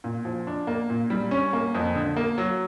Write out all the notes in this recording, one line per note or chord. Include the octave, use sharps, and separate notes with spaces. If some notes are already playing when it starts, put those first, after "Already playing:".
A#2
F3
D4
A#3
A#2
G3
C#4
A#3
F2
D3
A#3
F#3